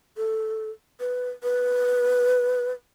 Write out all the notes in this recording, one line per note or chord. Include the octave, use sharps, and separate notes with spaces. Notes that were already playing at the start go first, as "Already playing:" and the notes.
A4
B4
B4